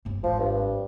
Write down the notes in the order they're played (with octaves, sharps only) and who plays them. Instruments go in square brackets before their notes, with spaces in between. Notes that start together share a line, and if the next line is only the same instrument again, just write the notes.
[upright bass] G1 F2
[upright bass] G#1 [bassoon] F3
[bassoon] G2